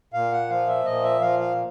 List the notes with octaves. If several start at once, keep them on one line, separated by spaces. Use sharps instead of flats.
A#2 F5
F#5
F3 F5
E5
A#2 D#5
E5
F3 F5
F5